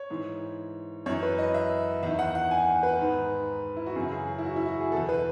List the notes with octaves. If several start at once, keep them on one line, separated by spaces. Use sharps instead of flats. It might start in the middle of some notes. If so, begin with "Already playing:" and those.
Already playing: C#5
G#2 E3
F#2 E3 C#5
B4
D#5
E5
E2 D#3 E5
F#5
F#5
G#5
B4
G#2 D#3
E4
F#4
F#2 C#3 E3 G#4
G#4
G#4
E4
F#4
E4
F#4
G#4
E2 B2 A4
B4